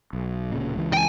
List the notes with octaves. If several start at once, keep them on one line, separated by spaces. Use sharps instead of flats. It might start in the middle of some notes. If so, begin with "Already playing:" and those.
B1
D1 A#2 C#3
C#2 E3
G5 G#5